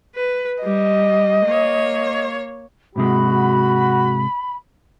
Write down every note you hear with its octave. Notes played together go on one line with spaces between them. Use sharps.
B4
G3 D#5
A#3 C#5
G#2 C3 G#3 F#4 B5